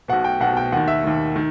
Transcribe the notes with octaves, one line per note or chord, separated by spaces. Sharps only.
B1 B2 F#5
G5
B1 B2 F#5
G5
D#2 D#3 F#5
E5
D#2 D#3
D#3